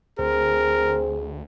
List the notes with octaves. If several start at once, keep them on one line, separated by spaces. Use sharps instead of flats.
D2 C4 G#4 A#4